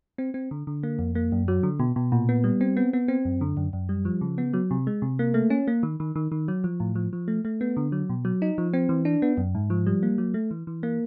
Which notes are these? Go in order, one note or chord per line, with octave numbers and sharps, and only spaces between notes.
C4
C4
D3
D3
A#3
F2
A#3
F#2
F#3
D3
B2
B2
A#2
B3
G3
C4
B3
B3
C4
F#2
D3
F#2
F#2
G3
F3
C#3
B3
F#3
C3
G#3
C3
A#3
A3
C#4
A#3
D#3
D#3
D#3
D#3
F#3
F3
A2
F3
F3
A3
A3
B3
D3
F#3
B2
F#3
D#4
F3
C4
E3
D4
B3
F#2
G#2
F3
G3
A#3
F#3
A3
E3
E3
A#3